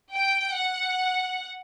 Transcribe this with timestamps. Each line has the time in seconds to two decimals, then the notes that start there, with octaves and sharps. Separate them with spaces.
0.13 G5
0.56 F#5